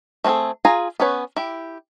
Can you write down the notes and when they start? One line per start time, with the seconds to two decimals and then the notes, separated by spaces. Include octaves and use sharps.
0.24 A3 C4 F#4 G#4 A4
0.65 F4 G#4 G#5 A#5
1.00 B3 C#4 B4 C#5
1.36 E4 G4